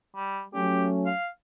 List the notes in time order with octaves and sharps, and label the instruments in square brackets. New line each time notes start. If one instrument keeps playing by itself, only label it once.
[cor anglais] G3
[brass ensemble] F#3 A3 C#4 [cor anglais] G4
[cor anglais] F5